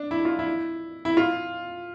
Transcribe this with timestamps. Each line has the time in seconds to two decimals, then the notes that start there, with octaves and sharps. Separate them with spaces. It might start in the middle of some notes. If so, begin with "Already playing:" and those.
Already playing: D4
0.11 E4
0.25 F4
0.39 E4
1.05 E4
1.17 F4